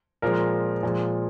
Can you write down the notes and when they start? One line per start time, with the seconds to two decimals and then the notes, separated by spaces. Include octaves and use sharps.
0.22 A#2 F3 G#3 A#4
0.83 A#2 F3 G#3